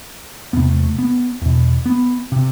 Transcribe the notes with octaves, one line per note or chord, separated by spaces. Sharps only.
E2 C3 B3
A3
A3
B3
E2 B2
B3
C3